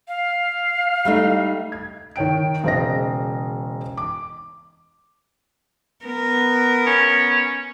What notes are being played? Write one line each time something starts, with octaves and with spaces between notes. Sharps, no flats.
F5
G3 A3 D#4
G#6
D#3 C#5 G5 D7
E1 C#3 C5 D#5 A#6
D6
B3 A#4
C#4